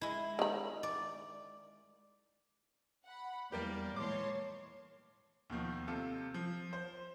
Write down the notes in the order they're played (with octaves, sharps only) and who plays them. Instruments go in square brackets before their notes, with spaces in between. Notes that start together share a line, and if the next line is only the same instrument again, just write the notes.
[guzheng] G#3 E4
[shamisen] D#3 B5
[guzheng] D5
[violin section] F#5 B5
[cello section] E2 [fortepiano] G3 A#3 G4 [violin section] D5
[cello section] A#2 E3 G#3 [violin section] C#5 A5 C6 [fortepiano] D6
[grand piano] D#2 B2 D#3 F3
C3 F4 A4
F3
C5